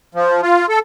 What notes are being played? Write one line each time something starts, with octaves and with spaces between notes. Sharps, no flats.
F3
F4
A4